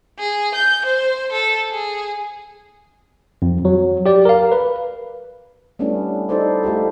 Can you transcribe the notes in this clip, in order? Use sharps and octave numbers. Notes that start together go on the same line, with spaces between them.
G#4
G6
C5
A4
G#4
F2
F#3
G4 D5
A#4 F5
B4
G3 A3 B3 C#4 D4 E4
D#4 E4 A4 C5 D5
A3 F4 G4 A4